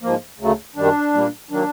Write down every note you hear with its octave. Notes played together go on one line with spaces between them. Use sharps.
G#2 F3 A#3
D2 C#3 F#3 A3
F#2 D#3 G3 D4
A#2 G3 A#3
D#3 F#3 A#3 D4